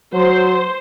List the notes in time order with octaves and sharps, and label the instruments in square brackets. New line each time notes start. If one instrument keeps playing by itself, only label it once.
[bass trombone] F#3 [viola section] C5